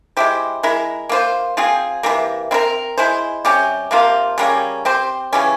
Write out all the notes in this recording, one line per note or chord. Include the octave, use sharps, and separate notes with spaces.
G#3 E4 G4 C5
G#3 E4 A#4
A#3 F4 C5
F3 C4 F4 G#4
C3 E3 G3 A#3
C4 E4 A#4
G#3 E4 G#4 C5
C3 G3 C#4 G4
C3 F3 A#3 F4
C#3 G3 A#3 C#4
C4 G4 C5
C#3 E3 G3 C#4